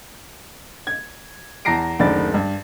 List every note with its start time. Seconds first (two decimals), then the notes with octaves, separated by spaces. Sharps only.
0.87 G#6
1.65 E2 A5 A#5 A#6 C7 D7
1.99 F#1 D2 D#3 D5 B5 A6
2.34 G2